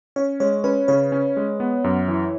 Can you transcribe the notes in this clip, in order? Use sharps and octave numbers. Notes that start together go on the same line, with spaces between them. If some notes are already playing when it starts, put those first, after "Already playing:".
C#4 C#5
G#3 C#5
C#4 B4
C#3 C#5
C#4
G#3
B3
F#2
E3